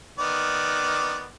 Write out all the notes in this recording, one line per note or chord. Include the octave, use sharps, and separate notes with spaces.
D#3 B3 D5